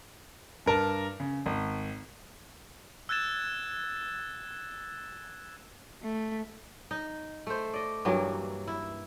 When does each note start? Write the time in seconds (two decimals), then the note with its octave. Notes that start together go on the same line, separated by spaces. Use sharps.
0.66 G2 A#4 A5
1.20 C#3
1.46 G#1
3.09 E6 F#6 G#6 A6 E7
6.02 A3
6.91 D#4
7.47 A3 C5
7.74 D5 D#5
8.05 G2 E3 F#3 A#3
8.68 E4